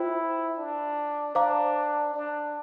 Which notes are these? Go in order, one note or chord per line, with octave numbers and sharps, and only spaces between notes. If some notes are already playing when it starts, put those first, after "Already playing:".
Already playing: E4 F4 C5 G5
D4
D4 C5 F5 A#5 D6
D4